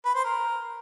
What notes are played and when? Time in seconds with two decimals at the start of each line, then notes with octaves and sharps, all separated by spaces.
0.05 B4
0.15 C5
0.25 A#4